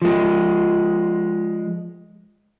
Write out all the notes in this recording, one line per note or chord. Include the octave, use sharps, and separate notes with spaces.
F3 G#3